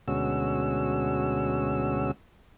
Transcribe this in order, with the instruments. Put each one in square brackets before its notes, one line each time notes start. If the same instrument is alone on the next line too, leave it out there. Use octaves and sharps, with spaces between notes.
[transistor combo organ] D2 B2 G#3 C#4 F#4 E6